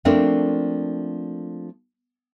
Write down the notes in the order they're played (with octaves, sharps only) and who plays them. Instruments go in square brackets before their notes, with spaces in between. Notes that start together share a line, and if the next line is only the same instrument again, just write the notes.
[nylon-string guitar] F3 A3 A#3 C4 D4